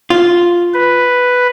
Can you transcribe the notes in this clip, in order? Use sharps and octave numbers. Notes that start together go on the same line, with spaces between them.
F4
B4